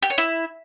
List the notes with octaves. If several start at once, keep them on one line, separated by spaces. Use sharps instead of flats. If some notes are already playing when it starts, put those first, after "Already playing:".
G4
C#5
E4